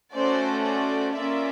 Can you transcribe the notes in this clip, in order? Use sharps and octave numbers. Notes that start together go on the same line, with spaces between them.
A3 C#4 F#4 A4 C5 D5
C5 D5
A#3 C#4 F4 D5 E5